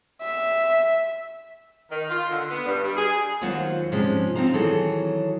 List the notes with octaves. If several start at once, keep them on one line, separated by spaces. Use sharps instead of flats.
E5
D#3
F4
D3
B3
G2
G3
G#4
D#2 F#3 F4 C5 F#5
G#2 C3 F3 G#3 C#4
C4 D#4 F4 C5 A#5
D#3 E3 F#3 G#4 A4 C#5